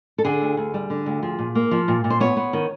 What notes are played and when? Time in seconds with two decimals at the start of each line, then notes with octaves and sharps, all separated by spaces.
0.18 A4
0.25 D3 G#4
0.41 D2
0.57 D2
0.74 G3
0.90 D3
1.06 D2
1.23 F3 G#4
1.39 A#2
1.55 A#3
1.71 F3
1.88 A#2
2.04 A#2
2.10 C5
2.20 B3 C#5
2.37 B3
2.53 D#3